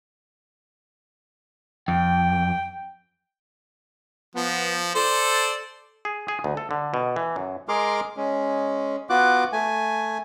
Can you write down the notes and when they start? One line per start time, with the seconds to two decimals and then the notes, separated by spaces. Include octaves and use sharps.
1.88 F2 G5
4.35 F3 B3
4.95 A4 C5 D5
6.05 G#4
6.28 G#4
6.44 D2
6.57 A4
6.71 D3
6.94 B2
7.16 E3
7.36 F#2
7.69 G#3 G#4 A#4 C6 D6 F6
8.17 G#3 C#4
9.10 B3 F4 F#4 D6 F#6
9.53 A3 G#5